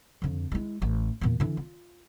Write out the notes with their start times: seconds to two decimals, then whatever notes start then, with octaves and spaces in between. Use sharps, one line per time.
0.22 F2 D3
0.52 G#3 E4
0.82 A1
1.21 E2 A#2
1.40 D3 E3
1.57 F4